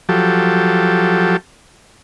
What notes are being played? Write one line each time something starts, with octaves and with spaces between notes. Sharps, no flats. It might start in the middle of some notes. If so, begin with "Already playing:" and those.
F3 F#3 G4 A4